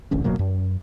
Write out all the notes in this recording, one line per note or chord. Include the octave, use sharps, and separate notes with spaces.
D1 A1 D2 C#4
D1 B2 F#3 A#3
F#2